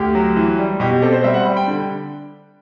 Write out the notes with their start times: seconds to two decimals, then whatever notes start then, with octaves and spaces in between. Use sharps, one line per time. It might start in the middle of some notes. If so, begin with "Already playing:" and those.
Already playing: D2 G4
0.15 F#3
0.36 E3
0.58 G3
0.80 B2 G4
0.91 G4
1.02 C4 A4
1.12 C5
1.24 G3 E5
1.34 F#5
1.40 C6
1.45 G3 B5
1.57 G5
1.68 D3